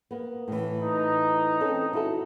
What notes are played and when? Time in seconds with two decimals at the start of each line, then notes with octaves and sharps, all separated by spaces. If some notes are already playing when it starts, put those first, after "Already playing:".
0.11 A#3 B3
0.48 A2 E3
0.84 D#4
1.61 C4 C#4 A4
1.93 E4 F#4 A4